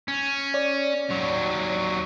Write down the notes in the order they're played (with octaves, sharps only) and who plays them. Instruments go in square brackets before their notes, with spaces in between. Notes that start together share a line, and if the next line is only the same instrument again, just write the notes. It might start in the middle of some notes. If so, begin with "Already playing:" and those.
[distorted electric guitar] C#4
[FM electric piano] C#5 D5
[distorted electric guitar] D#2 F#3